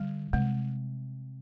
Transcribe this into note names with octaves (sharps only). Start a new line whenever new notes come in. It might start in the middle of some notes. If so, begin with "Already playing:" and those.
Already playing: D3 G3
C3 G#3